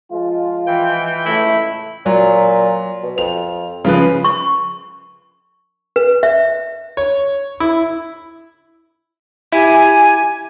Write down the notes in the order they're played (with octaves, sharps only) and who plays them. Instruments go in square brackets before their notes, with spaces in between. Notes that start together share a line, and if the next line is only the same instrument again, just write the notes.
[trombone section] F3 G#3 F4
[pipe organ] E3 G5 G6
[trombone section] C#2 A2 A3 [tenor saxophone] E4
[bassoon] A#2 [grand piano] F#3
[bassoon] B2
[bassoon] F2 [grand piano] F7
[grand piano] C#3 F3 B4 [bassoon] B3
[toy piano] C#6
B4
E5
[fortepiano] C#5
E4
[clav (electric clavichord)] E4 [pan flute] G4 [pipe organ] G#5